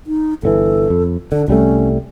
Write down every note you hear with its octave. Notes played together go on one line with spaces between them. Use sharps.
D#4
G1 C#3 E3 A4
F2
D3 D4
C2 G3 A3 C#4